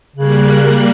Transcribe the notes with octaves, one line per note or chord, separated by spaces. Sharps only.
C#3 G3 A#3 F#6